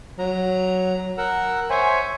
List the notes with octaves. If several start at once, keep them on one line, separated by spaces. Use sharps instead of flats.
F#3 A#5
A#4 F#5 E6
C5 C#5 E5 G#5